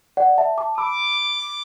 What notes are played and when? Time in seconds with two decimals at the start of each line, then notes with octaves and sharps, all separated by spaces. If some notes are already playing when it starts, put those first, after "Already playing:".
0.17 D5 F#5
0.38 E5 A5
0.58 A5 D6
0.78 B5 D6 E6